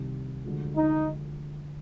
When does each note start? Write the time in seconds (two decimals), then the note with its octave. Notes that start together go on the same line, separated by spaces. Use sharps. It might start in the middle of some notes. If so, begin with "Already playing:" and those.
Already playing: C2 C3 D#3 G3
0.45 D2 D3 F3 G#3
0.76 D#4